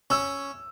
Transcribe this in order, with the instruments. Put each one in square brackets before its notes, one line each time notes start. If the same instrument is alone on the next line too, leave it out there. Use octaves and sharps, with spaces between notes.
[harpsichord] C#4 [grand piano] E6